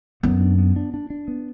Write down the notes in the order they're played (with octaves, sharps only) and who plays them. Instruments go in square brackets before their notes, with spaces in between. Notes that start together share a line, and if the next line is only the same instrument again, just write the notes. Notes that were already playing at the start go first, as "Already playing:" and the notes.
[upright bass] F#2 [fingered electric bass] B3
[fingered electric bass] D4
B3
D4
D4
D4
B3